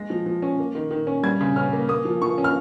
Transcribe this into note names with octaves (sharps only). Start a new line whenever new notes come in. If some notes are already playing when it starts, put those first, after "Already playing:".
Already playing: G#3 A#6
F3
F3
C#4
A#3
D#3
D#3
C#4
G3 G#6
C#3
C#4 F6
A#3
A#3 D#6
F3
F3 C#6
C#4
F6